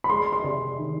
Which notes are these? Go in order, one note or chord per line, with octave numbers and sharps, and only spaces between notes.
B5
G#3 C6
C6
C3
D#3